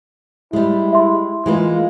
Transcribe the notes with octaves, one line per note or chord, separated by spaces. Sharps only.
G3 G#3 E4
E5 C6
E3 G#3 A#3 F4